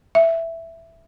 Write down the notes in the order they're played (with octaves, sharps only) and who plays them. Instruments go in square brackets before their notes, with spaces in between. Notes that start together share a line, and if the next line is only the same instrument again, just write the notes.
[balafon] E5